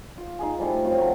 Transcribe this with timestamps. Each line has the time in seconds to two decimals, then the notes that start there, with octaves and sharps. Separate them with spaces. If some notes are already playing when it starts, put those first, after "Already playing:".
0.17 F4
0.39 D#4 G#4 G#5
0.58 F3 G3 A3 E4
0.85 F#2 A2 C4 F4
0.97 F#3 A3 A#4 F5